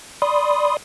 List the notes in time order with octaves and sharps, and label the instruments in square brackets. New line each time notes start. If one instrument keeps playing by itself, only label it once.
[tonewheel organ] D5 B5 C6 D#6